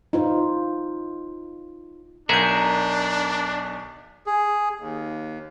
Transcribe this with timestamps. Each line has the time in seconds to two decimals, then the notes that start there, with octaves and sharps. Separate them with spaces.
0.13 D#4 F4 C5
2.29 B1 D4 F#4 G#4 A#4 E5 G6
4.27 G#4
4.80 D#2